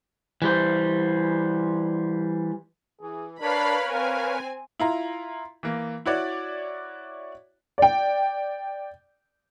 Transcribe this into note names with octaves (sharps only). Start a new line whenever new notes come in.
E3 G3 C5
E3 G#4
D4 A#4 B4 C#5 F5 B5
C4 F5 G#5
E4 F4 A#5
E3 A#3
E4 F#4 C#5 D5
D5 G5